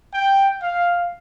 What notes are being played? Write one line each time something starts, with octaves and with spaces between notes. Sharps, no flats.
G5
F5